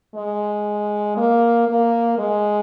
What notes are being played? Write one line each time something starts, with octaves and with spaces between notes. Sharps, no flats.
G#3
A#3
A#3
G#3